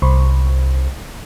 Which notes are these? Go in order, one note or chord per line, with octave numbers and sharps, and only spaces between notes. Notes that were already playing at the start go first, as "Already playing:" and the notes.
C2